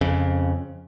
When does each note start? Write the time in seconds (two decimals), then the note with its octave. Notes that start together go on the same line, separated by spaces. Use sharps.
0.01 F2 C#3